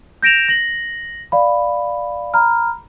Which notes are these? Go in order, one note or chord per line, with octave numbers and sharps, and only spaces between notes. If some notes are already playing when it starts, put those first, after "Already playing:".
G6 A#6 D7 E7 F7
A#6 F#7
D5 F5 B5
A#5 B5 F6